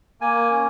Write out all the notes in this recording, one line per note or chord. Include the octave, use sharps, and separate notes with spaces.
A#3 G#5
C#4